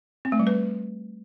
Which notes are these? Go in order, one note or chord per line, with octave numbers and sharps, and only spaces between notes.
C4
A3
G3
B4